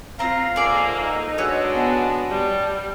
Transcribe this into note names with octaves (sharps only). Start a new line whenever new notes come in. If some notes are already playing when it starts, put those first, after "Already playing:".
C4 F4 A#5
G#2 A#3 G#4 A4 D5
D#4
G#3 D4 F#4 B4 C#5 E6
B3 A5
G3